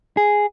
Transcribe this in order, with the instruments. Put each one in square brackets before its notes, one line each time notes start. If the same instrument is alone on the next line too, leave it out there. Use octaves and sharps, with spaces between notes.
[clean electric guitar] G#4